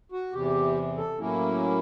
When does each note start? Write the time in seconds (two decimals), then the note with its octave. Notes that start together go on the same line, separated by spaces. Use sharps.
0.12 F#4
0.33 E2 C3 E3 G4
0.97 A4
1.18 A2 F#3 A#3 C#4 E4